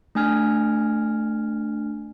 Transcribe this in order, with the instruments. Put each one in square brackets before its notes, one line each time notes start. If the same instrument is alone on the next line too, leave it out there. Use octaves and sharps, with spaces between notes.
[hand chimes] A3 D4 G#5 F6